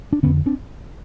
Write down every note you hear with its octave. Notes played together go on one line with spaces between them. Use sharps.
D4
F2 D3 B3 C#4
C4 D4